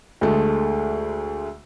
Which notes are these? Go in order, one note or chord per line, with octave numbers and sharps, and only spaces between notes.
D2 G#3 A3